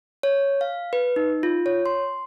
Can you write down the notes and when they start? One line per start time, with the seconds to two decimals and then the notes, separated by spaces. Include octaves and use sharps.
0.23 C#5
0.61 F5
0.93 B4
1.16 D#4
1.43 F4
1.66 C#5
1.86 C6